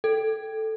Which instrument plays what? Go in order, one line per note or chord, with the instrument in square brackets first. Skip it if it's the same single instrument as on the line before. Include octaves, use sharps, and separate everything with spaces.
[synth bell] A4